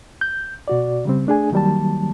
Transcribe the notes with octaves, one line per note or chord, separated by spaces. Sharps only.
G6
B2 F#4 D5
C#3 G3 C4
A3 D4 G#4 G#5
D#3 F#3 G3 A#3 A5